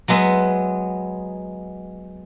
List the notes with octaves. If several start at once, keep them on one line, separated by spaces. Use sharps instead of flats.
F#3 G#3 B3 E5